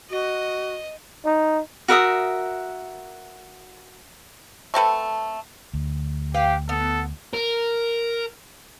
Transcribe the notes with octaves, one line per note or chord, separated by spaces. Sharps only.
F#4 D#5
D#4
F#4 A#4 E5 D#6
A3 C4 A4 B4
D2
G4 B4 F5 G5
B3 A4
A#4